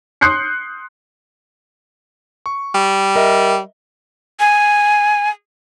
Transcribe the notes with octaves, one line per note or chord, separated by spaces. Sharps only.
C6 D#6 F#6 G6 C7 C#7
C#6
G3
A#4 D#5 E5
G#5